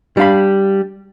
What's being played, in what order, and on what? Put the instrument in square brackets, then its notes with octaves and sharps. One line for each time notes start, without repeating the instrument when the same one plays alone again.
[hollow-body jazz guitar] G3 D4 F5 B5